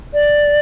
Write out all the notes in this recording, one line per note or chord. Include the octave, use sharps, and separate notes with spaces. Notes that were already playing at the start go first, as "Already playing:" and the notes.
D5